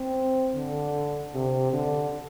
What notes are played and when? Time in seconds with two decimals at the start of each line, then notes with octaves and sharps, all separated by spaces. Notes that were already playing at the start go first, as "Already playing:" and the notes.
Already playing: C4
0.56 D3
1.34 C3
1.73 D3